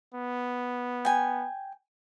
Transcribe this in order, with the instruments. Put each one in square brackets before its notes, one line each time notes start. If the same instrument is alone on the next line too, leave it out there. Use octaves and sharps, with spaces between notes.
[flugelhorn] B3
[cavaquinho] G5 G#5